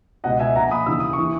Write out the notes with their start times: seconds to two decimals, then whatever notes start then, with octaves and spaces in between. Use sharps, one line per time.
0.24 C#2 B2 D#5 F#5
0.39 E5 G#5
0.55 A#1 F#5 A#5
0.59 A#2
0.71 B5 D#6
0.86 D#2 C#3 E3 E6
1.00 D#6
1.13 E3 C#6